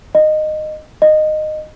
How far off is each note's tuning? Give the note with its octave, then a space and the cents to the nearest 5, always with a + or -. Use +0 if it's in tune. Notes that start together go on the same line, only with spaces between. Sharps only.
D#5 -15
D#5 -15